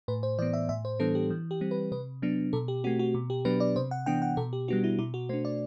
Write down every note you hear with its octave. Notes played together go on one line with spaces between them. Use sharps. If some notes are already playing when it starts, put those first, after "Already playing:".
A2 B4
C5
E3 B3 D5
E5
A2 E5
C5
E3 G3 B3 D4 A4
G4
E3
G4
G3 C4
B4
C3 B4
F#3 B3 D4
B2 A4
G4
A3 C4 F#4
F#4
B2
G4
F#3 B3 D4 B4
D5
C3 C5
F#5
E3 B3 D4 G5
F#5
B2 A4
G4
G3 B3 D4 F#4
E4
B2 E4
F#4
A3 D4 C5
D5